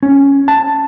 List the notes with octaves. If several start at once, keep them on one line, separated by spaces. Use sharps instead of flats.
C#4
A5